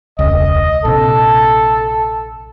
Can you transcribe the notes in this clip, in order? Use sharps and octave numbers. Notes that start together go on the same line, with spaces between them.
E1 C#2 D#5
A#1 C3 A4